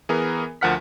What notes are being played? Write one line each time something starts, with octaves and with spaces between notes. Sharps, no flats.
E3 B3 G#4 A#4
D2 F3 A#4 F#5 F6 B6